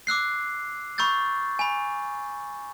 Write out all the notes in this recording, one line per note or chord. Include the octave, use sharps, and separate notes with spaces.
D6 E6 F#6 C7
B5 C#6 E6 G6 A6
G#5 B5